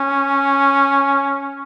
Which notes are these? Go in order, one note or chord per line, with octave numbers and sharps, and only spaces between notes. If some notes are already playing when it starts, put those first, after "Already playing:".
Already playing: C#4